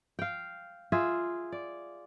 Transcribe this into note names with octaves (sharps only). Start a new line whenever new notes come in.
F5 G5
F4 G#4 E5
D5